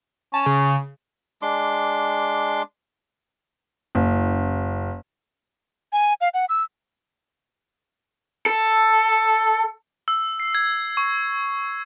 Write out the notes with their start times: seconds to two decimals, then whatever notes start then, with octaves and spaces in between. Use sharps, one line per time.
0.34 C#4 A5
0.46 C#3
1.42 G#3 D4 C6 D6
3.95 F#1
5.92 G#5
6.21 F5
6.34 F#5
6.49 E6
8.46 A4
10.08 E6
10.40 C7
10.55 G#6
10.97 C#6